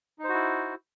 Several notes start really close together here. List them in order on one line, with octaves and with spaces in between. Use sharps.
D#4 C5 F#4 E4